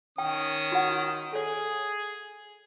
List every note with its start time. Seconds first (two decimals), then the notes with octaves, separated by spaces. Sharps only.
0.18 D#3 C#4 G5 D#6
0.72 F#4 F#5
1.33 G#4 A4 C#5